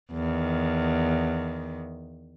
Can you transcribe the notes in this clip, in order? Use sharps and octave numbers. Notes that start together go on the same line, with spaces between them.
E2 D#3